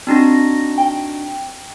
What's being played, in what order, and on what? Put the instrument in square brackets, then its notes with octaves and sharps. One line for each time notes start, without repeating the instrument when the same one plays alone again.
[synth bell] C4 A#6 [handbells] D4 D#4 F#4
[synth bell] G5